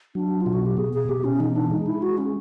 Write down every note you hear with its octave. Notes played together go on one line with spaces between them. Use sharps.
F#3 D4
B2 F4
F#4
G4
B2 G#4
G#4
B2 G4
C#4
E3 D#4
D4
G#3 D#4
E4
G#3 F#4
C#4